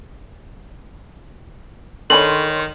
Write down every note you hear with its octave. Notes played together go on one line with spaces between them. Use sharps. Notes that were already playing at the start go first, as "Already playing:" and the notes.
D#3 D4 A4 C#5 G#5 B5 C6 F#7